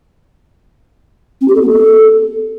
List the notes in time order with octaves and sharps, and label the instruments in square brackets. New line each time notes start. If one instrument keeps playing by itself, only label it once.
[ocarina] C4
G4
A4
B3
A4